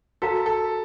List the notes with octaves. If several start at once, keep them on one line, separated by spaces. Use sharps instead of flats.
F#4 A4 A#4 F5 A#5
A4